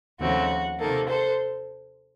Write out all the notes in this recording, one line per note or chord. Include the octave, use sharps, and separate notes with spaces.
D#2 C#3 F3 A3 C4 F#4
C3 D#3 A#3 A4
A4 C5